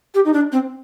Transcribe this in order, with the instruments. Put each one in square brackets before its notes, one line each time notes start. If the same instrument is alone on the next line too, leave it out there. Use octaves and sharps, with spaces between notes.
[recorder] G4
D#4
D4
C4